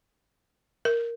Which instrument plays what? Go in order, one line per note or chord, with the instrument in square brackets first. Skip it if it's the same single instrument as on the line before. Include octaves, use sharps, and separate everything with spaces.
[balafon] A#4